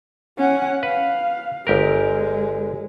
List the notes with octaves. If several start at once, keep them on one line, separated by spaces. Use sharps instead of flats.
C#4 F#5
B4 F5
G1 G#3 G4 A#4